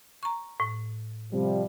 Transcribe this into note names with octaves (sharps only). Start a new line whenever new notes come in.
A#5 C#6
A2
C3 F3 G3